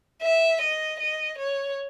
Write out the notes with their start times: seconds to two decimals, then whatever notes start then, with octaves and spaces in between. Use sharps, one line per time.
0.22 E5
0.61 D#5
1.00 D#5
1.38 C#5